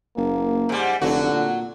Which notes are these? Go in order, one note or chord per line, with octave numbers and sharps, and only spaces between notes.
F#1 A#3
G#2 G3
F1 D3 F#3 F#4
A#2